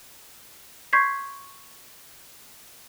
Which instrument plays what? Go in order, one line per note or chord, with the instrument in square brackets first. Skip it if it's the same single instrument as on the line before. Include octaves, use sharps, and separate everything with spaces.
[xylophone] C6 C#6 G6 G#6 B6 C7